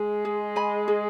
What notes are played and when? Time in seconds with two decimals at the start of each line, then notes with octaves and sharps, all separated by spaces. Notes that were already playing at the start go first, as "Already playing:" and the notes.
Already playing: G#3
0.25 G#4
0.56 D#5 G#5 B5
0.88 G#4